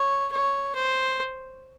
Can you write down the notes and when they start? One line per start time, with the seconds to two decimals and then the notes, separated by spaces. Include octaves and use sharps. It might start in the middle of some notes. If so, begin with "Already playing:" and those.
Already playing: C#5
0.32 C#5
0.75 C5